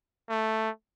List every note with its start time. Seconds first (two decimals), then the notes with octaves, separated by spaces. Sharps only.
0.29 A3